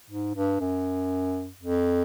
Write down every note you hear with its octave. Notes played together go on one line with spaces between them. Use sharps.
G#2
G2
F#2
F2